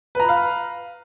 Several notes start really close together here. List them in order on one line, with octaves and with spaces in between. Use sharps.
B4 A#5 B5 F5